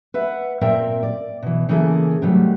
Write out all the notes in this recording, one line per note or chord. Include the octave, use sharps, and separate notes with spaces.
B4 E5 F#5
A#2 C4 A#4 D5 E5 G5
D5
B2 E3
C#3 E3 A#3 G#4 A4
G#2 C3 D#3 F#3 G3 A3